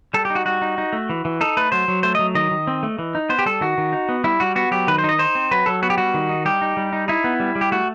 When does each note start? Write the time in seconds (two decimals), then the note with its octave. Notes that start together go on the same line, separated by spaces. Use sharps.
0.14 G3 A4
0.25 G4
0.30 D#4
0.35 F#4
0.46 G3 F#4
0.62 D#4
0.78 D#4
0.93 A3
1.09 E3
1.25 E3
1.41 D#4 A4
1.57 A3 B4
1.72 F#3 C5
1.88 F#3
2.03 A3 C5
2.15 F#3 D#5
2.35 D#3 D#5
2.51 D#3
2.67 C4
2.83 A3
2.99 E3
3.15 D#4
3.29 B3 C5
3.39 G4
3.46 G3 A4
3.61 D#3 F#4
3.78 D#3
3.93 D#4
4.09 B3
4.24 G3 E4
4.40 G3 F#4
4.55 B3 F#4
4.71 F#3 G4
4.88 D#3 B4
4.98 C5
5.04 D#4
5.09 D#5
5.19 D#4 C5
5.35 C4
5.51 F#3 B4
5.66 F#3 A4
5.82 B3 F#4
5.90 G4
5.98 G3 F#4
6.14 D#3
6.29 D#4
6.45 G3 G4
6.61 D#4
6.77 G3
6.93 D#4
7.08 D#4 E4
7.24 B3
7.40 G3
7.56 G3
7.61 G4
7.72 A3 F#4